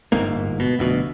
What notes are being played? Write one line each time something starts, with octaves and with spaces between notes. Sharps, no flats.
D1 G1 G#2 A#3
B2
F1 D2 B2